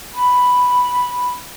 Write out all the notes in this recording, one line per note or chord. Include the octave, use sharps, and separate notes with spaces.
B5